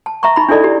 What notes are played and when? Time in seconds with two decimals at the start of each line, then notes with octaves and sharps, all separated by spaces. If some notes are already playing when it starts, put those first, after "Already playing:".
0.06 A5
0.23 E5 A#5 C#6
0.36 D#4 B5
0.49 D4 E4 G#4 A4 D5 D#5
0.64 G4